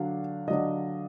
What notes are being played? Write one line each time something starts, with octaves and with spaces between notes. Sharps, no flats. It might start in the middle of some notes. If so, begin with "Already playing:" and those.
Already playing: D3 F#3 D4 F5
D3 F#3 D4 D#5